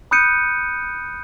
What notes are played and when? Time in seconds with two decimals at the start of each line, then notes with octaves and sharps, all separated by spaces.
0.11 B5 D#6 F#6 G6 C#7 D#7